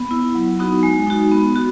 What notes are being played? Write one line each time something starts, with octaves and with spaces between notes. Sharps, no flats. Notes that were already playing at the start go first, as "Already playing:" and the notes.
Already playing: B3
E4
F#3
B3 D#4 F#4
G#3
D#4 F#4
B3
F#4